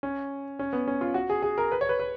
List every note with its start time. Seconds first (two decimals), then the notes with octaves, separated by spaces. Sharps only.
0.03 C#4
0.59 C#4
0.73 B3
0.88 C#4
1.01 F4
1.14 F#4
1.30 G#4
1.42 G#4
1.58 A#4
1.72 B4
1.81 C#5
1.89 B4
1.99 B4